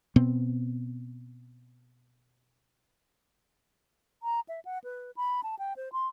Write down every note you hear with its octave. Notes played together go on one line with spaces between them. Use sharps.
B2 B3 C4
A#5
E5
F#5
B4
B5
A5
G5
C5
C6